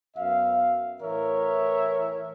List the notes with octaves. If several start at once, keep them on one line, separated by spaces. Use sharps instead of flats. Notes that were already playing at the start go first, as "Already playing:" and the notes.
F#2 B3 E5 F5
A2 E3 A#4 C#5 E5